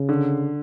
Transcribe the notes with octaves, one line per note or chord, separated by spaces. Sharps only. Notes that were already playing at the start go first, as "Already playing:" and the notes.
Already playing: C#3
D3